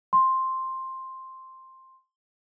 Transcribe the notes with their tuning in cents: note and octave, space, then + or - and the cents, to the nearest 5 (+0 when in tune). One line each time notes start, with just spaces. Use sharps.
C6 +5